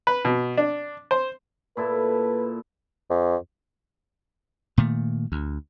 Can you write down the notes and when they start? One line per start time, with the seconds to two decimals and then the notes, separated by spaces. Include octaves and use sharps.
0.07 B4
0.25 B2
0.57 D4
1.11 C5
1.77 A#2 E4 A4 B4
3.10 F2
4.78 A#2 D#3 A3
5.32 D2